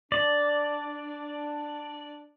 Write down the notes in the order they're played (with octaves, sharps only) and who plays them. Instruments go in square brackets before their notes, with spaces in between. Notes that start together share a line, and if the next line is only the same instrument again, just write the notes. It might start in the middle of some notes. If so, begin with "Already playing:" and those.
[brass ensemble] D4 [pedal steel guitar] D5